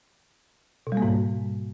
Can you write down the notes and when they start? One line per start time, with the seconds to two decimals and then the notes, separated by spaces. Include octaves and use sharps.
0.87 B2
0.92 G3
0.97 A#3
1.02 G#2